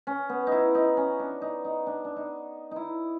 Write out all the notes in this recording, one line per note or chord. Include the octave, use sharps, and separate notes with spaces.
C#4
B3
D#4 E4
D#4
C#4
D4
D#4
D#4
D4
D4
D#4
D#4 E4